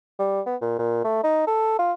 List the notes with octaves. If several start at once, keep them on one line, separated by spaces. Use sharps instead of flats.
G3
B3
A#2
A#2
A3
D#4
A4
F4